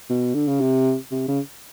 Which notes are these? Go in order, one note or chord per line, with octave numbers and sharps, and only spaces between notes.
B2
D3
C#3
C3
C3
C#3